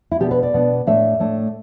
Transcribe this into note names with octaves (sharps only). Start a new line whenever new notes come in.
E4
B2 B3 D4 G4
B4
D5
B2 B3 D4
A2 A3 D4 E5
A2 A3 D4